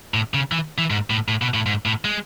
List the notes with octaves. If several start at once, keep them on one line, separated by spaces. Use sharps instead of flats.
A2
C#3
E3
E3
G#2
A2
A2
B2
A2
G#2
A2
G#3